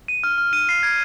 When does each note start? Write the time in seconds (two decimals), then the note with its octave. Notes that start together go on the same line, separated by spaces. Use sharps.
0.08 D#7
0.24 F6
0.38 F6
0.53 D#7
0.69 C7
0.83 G#6